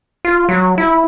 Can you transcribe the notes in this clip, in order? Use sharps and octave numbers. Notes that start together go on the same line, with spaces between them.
F4
F#3
E4